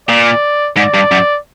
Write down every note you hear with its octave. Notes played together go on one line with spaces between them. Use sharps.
A#2 D5
G#2 D5
G2
F#2